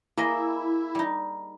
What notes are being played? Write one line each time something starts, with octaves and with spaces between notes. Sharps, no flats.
A#3 E4 G#4 D#5
G3 D#4